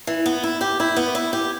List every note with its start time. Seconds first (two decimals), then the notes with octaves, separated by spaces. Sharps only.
0.07 E3
0.26 B3
0.44 E4
0.61 G4
0.80 E4
0.96 B3
1.15 E4
1.33 G4